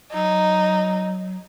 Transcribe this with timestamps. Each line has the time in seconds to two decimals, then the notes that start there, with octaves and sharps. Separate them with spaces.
0.13 F#3 D#4